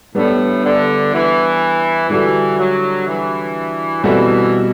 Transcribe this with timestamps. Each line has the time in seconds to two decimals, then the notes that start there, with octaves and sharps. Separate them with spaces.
0.15 A2 G3 B3 D4 A4
0.64 D3
1.12 E3
2.09 D3 E3 G3 D4 F#4 A4
2.58 F#3
3.06 E3
4.03 B2 E3 G3 C4 F#4 A4